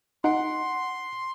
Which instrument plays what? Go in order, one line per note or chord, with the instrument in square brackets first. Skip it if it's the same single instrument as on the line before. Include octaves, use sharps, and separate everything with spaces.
[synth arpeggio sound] D#4 D7 [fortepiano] F#5 [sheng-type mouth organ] C6